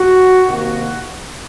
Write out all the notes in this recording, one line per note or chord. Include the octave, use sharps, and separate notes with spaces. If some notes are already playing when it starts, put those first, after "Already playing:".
Already playing: F#4
C3 D#3 A#3 F#4